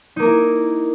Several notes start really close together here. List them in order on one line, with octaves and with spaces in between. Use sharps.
D#4 A#3 A#4 E4